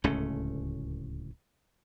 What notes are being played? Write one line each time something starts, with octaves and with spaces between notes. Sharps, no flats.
D1 C#2 A3 C#4